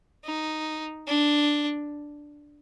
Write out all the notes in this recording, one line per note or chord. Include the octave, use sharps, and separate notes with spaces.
D#4
D4